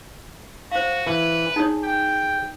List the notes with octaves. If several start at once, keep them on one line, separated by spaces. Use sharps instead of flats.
F#4 C5 F5
E3 B4
D#4 G#4 C#5
G5